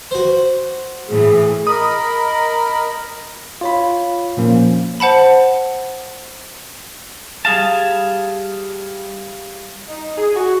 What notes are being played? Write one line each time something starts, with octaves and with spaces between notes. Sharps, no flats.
F#4 C5
A2 E3 G#4
A#4 D#5 B5 D#6
F4 C#5 B5
A#2 F3 A#3 C#4
C5 F#5 A5 B5
G3 G#4 F5 A5
D#4
G#4
F#4